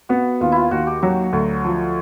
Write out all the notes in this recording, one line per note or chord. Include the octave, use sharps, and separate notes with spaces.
B3 F#4
D#2 F4
E4 F4
D#2 F#4
G4
F#3 F#4
D2
F3